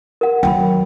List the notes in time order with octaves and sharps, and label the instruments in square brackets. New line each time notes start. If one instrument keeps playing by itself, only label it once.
[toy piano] A#4 F#5
[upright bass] D#3 F#3 [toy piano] G5 B5